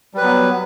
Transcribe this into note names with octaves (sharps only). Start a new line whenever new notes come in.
F#3 G3 B3 B4